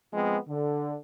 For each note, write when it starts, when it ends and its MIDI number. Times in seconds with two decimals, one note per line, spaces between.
0.13 0.37 53
0.13 0.37 56
0.13 0.37 59
0.13 0.37 60
0.47 0.96 50